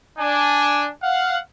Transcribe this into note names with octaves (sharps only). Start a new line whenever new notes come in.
D4 G#5
F5 F#5